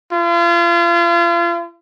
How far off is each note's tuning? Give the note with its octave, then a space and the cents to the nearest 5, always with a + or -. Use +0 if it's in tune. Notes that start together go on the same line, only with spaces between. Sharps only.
F4 -35